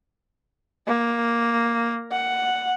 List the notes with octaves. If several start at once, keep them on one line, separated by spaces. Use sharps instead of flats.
A#3
F#5